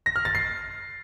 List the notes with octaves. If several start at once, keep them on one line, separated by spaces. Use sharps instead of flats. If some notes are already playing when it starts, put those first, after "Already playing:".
A#6
F6
A6
C7